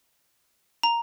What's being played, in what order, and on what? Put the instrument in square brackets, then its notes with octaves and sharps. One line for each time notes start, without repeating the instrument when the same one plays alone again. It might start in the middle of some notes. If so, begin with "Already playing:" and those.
[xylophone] A#5